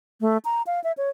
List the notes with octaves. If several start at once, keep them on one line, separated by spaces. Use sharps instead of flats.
A3
A#5
F5
E5
C#5